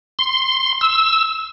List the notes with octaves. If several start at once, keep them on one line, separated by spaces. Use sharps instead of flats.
C6
E6